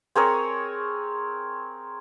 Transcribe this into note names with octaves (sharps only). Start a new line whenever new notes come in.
C4 G#4 A#4 C#5